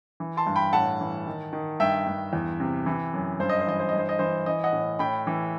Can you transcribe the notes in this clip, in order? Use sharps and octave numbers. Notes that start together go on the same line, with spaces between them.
E3
A5 C6
G2
G5 B5
A2 F#5 A5
E3
D#3
D#3
G2 E5 G5
G2
E2
C3
E3
F#2
G2 C5
D#5
C5
E3 D#5
C5
G2 D#5
C5
D#5
E3 C5
E3 D#5
D#5 F#5
A2
A2 G5 B5
E3